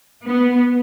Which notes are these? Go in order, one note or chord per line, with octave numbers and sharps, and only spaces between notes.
B3